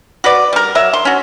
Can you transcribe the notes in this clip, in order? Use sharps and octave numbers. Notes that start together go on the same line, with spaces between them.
F#4 B4 D5
G3 A#4
F#3 A#4 E5
C6
C#4 F#4